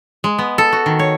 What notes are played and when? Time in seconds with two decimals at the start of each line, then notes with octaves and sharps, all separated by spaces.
0.24 G#3
0.39 B3
0.58 A4
0.72 F#4
0.86 D#3
0.99 C#5